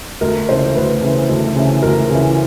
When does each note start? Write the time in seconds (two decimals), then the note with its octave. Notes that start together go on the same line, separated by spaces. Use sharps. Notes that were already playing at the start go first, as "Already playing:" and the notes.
0.21 D2 A#4
0.49 C#3 E3 C5
0.75 D2 B4
1.02 C#3 E3
1.29 D2
1.56 C#3 E3
1.83 D2 A#4
2.10 C#3 E3